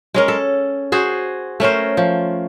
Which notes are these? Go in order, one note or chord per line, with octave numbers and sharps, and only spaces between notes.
G#3 C#4 A#4
A4
F#4 G#4 C5
A3 C#4 A#4 C5
F3